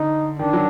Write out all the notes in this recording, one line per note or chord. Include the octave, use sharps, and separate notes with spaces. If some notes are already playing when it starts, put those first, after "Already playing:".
Already playing: D3 D#4
D#3 D4
F#3